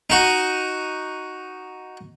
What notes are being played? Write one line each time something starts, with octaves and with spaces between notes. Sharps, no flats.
D#4 F#4